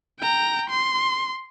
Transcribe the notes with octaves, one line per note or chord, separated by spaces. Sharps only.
G5 A#5
C6